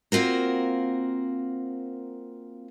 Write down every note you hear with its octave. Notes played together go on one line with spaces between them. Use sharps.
A#3 C4 F4 F#4 A#4